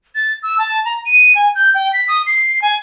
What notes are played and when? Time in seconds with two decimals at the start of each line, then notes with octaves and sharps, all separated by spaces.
0.15 A6
0.43 E6
0.58 A5
0.85 A#5
1.06 D#7
1.35 G#5
1.55 G6
1.74 G5
1.93 B6
2.08 D#6
2.26 C7
2.62 G#5